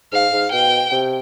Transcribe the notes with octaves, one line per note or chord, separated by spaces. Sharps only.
G#2 F5
G#2
B2 G5
C3